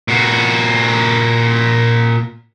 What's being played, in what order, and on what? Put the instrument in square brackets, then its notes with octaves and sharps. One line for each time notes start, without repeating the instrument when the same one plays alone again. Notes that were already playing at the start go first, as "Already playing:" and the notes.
[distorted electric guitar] A#2 F#4